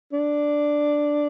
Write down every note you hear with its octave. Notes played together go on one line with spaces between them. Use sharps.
D4